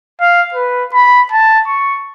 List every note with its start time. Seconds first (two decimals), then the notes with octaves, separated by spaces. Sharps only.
0.21 F5
0.54 B4
0.93 B5
1.32 A5
1.67 C#6